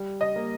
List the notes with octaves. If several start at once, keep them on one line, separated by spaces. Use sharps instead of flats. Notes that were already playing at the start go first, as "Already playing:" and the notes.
Already playing: G3
D#5
A#3